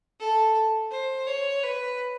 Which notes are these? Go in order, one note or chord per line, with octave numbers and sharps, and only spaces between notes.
A4
C5
C#5
B4